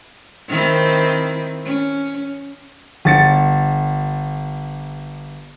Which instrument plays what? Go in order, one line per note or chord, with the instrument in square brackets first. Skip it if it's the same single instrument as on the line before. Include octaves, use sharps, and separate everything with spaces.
[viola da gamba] D#3 C4 E4
C#4
[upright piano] G1 A6 C#7